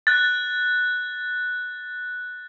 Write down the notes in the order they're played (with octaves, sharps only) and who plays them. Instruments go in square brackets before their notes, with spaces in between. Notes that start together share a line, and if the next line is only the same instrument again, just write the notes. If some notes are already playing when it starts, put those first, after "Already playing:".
[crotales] F#6 A6